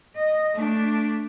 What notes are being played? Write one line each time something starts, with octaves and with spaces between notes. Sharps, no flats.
D#5
A3 D4